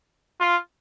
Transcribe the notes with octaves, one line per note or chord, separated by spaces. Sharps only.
F4